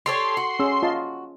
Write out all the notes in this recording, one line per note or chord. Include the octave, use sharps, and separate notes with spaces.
G4 A4 C#5 C6
F#4
C#4 G#4 E6
F4 D#5 A5